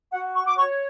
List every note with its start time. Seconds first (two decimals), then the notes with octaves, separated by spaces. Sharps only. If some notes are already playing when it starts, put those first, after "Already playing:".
0.12 F#4 F#5
0.34 C#6
0.46 D6
0.57 C#5 C#6